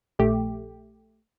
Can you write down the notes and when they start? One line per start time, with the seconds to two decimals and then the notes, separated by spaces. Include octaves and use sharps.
0.19 A#1 A3 G4